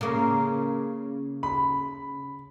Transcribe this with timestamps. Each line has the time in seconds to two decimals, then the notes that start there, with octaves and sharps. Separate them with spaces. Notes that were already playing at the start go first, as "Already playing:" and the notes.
0.01 C#3 A#3
1.43 B5